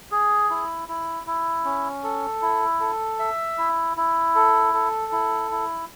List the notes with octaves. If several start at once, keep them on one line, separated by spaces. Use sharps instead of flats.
G#4
E4
E4
E4
C#4
A4
E4
A4
E5
E4
E4
A4
A4
E4
E4